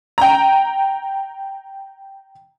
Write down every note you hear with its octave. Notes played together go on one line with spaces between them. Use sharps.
G5 A#5